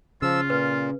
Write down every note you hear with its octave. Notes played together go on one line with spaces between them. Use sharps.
C#3 F3 F4 E6
A#2 B4